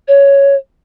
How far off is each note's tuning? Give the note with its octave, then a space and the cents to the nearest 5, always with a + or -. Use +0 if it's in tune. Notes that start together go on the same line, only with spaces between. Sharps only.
C#5 +5